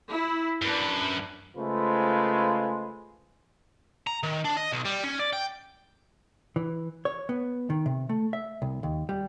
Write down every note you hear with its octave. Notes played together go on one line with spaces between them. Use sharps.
E4
F#2 D4 B4
C#3 G#3 A3 F4 B4 C5
A#5
D#3
D4
D#5
B1
G3
C#4
D5
G5
E3
C#5
B3
D#3
C3
A3
E5
C2
D#2
G3